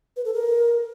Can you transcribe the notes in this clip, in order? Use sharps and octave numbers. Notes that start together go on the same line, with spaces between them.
B4
A4
A#4